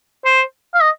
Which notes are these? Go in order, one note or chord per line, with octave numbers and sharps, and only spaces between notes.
C5
F5
D#5